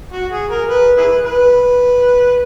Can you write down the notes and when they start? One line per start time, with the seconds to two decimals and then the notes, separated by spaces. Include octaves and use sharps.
0.13 F#4
0.32 G#4
0.51 A#4
0.70 B4
0.98 E4 G#4 B4
1.26 B4